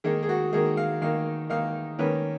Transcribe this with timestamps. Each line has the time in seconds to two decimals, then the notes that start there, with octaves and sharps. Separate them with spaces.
0.04 D#3 A#3 D#4 G#4
0.23 G#4
0.29 F#4
0.53 D#3 A#3 D#4 G#4
0.77 F5
1.02 D#3 A#3 D#4 F5
1.50 D#3 A#3 D#4 F5
1.99 D#3 A#3 C#4 B4